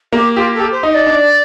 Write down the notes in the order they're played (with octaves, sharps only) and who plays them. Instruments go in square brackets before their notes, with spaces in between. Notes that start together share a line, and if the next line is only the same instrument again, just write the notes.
[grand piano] A#3 [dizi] G4
[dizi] F4 [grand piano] G4
[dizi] A4
[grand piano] G4
[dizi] C5
[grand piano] D#4
[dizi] D#5
D5
[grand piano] D4